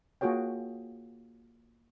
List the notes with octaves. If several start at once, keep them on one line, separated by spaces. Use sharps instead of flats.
A#3 F4 F#4 G#4 C#5 G5